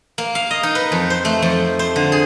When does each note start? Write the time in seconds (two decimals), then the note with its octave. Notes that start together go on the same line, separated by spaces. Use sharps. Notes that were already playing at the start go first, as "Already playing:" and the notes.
0.18 A#3
0.35 F5
0.51 D#5
0.63 D#4
0.75 B4
0.92 F2
1.10 C5
1.25 A3
1.42 F2
1.79 C5
1.96 D3
2.12 G#4